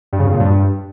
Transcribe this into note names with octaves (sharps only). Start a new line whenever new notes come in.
G2
C#3
F2
A#2
G2